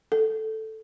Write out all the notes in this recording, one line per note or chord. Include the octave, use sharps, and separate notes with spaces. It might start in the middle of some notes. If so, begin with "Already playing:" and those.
A4